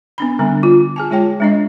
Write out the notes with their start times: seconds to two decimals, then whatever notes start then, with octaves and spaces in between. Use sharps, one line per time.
0.18 B3 D4 B5
0.39 D3 G3 B3 D4
0.63 F4
0.96 G#4 G#5 A5
1.11 G#3 F4 C#5 G5 A5
1.40 G#3 D4 D#5